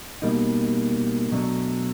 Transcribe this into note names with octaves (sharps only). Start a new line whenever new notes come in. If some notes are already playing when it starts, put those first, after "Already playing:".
B2 G3 A#3 D#4
B2 F#3 A3 D4